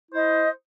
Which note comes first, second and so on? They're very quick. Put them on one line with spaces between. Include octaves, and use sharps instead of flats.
E4 C5 D#5